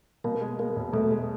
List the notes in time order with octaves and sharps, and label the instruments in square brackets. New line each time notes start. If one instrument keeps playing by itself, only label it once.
[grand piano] B2 [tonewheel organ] A#3
[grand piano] G#3
[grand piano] G#3 [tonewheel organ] A#3
[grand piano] E1
[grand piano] B2 [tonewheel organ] A3
[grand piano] G#3